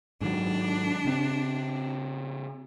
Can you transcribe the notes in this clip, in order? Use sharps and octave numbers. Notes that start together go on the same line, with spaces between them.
G#2 D#3 F#3 D4
C#3 C4